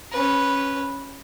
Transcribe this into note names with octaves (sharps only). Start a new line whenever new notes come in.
C#4 B4